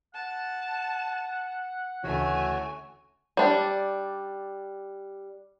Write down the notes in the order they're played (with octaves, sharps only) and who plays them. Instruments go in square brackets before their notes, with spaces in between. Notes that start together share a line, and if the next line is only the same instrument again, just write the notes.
[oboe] F#5 [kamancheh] A5
[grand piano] D2 C#3 E3 [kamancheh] A3 G#5 [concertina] F#4 C#5
[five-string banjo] G3 D4